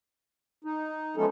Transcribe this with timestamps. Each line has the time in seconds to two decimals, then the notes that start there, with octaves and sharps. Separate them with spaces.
0.64 D#4
1.17 F3 G#3 A3 B3 C#4 A4